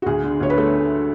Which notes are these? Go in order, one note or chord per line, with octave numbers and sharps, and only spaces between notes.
F#4
D2 G#4
D3
D2 C#5
B4
A3 A4